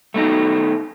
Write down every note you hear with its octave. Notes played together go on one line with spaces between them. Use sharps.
A3 B3 D#4